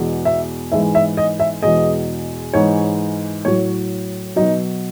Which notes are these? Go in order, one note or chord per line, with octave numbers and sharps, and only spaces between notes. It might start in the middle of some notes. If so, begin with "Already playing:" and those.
Already playing: E2 B2 G#3
E5
G#2 E3 G#3 E5
E5
D#5
E5
E2 B2 G#3 D#5
G#2 E3 G#3 C#5
A2 F#3 C#5
B2 F#3 D#4